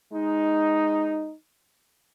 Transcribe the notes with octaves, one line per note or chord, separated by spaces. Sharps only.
G#3 D#4